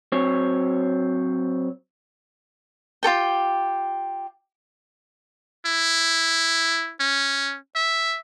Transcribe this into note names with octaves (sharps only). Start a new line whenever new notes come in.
F#3 C4 C#5
F4 G4 A4 G5
E4
C#4
E5